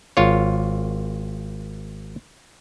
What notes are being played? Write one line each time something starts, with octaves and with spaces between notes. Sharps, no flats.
G#1 F4 C#5